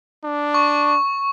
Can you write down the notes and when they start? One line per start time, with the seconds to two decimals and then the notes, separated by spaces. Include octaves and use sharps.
0.24 D4
0.54 C#6